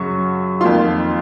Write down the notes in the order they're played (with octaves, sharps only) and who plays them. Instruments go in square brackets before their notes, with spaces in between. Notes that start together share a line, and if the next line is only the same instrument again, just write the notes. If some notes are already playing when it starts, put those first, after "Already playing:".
Already playing: [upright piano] F#2 C#3 F#3 C#6
F2 D#3 A#3 F4 C6